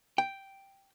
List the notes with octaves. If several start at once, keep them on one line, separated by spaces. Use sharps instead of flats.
G5